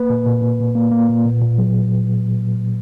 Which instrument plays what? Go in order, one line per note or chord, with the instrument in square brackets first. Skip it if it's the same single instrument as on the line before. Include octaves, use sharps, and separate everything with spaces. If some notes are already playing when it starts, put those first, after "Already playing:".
Already playing: [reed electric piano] A#3 B4
A#2
A#2
A#2
A#2
A#3
A#3
A#2
A#2
A#2
F#3